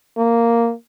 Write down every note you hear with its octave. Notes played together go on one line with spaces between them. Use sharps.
A#3